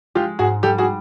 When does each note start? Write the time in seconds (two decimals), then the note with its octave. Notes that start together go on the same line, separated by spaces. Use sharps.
0.15 G#3 F4 G4
0.39 G#2 F#4 G#4
0.63 G3 G4 A4
0.78 F#4 G#4